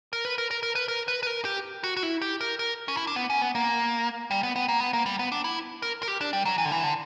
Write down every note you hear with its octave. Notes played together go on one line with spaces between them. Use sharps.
A#4
B4
A#4
A#4
A#4
B4
A#4
B4
B4
A#4
G4
F#4
F#4
E4
G4
A#4
A#4
C#4
E4
D4
B3
C#4
B3
A#3
G3
B3
B3
A#3
B3
A#3
G3
B3
D4
E4
A#4
A#4
G4
D4
G3
F#3
E3
D3
E3
D3